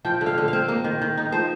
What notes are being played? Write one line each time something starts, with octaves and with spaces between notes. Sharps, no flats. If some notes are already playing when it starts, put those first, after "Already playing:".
F3 G5
D3
F5
D3
F5
C4
A#3
D#3
D#3
D#4
F3 C5